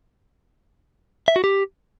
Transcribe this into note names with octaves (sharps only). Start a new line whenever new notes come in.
E5
F#4
G4